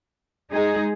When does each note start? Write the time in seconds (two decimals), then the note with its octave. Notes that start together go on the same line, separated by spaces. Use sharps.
0.52 G#3 D#4 G#4